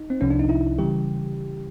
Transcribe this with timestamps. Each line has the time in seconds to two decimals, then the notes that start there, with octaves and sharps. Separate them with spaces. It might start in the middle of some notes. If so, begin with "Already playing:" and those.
Already playing: D#4
0.10 C4
0.21 C2 C3 F3 C#4
0.30 D4
0.39 D#4
0.49 E4
0.78 C#3 E3 G3 G4